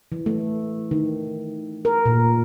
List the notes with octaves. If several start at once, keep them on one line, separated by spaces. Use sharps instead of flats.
E3
A3
D#3
A#4
A#2